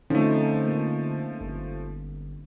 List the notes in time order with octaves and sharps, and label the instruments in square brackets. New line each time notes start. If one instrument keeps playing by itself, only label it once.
[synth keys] D3 [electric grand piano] F3 A3 [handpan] C4 C#4 D#4
[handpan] A#3
[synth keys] G1